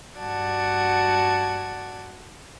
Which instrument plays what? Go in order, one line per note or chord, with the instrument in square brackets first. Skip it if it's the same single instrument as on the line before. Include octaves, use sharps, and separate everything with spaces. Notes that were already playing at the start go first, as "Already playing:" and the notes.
[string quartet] G2 F#4 D5 F#5 A5 G#6